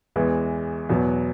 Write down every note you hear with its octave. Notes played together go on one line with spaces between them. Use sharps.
E2 E3 G#3
E2 B2 F#3 B3